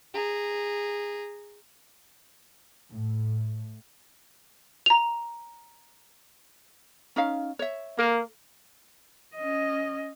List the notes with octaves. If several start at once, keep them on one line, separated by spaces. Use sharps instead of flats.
G#4 A#5
A2
A#5 F7
C#4 D#4 F5
C#5 E5
A#3 A#4
C#4 D#5